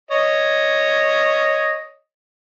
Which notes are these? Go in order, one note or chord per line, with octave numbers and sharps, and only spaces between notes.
C#5 D#5